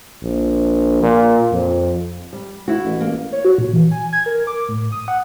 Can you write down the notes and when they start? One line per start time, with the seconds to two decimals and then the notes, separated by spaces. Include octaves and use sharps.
0.22 A#1
1.03 A#2
1.52 F2
2.33 G3
2.68 E4 F#4
2.84 A1
3.01 A#3
3.32 C#5
3.45 F#4
3.58 A#2
3.73 E3
3.91 G#5
4.13 G#6
4.26 A#4
4.47 D6
4.68 A2
4.92 D#6
5.08 F#5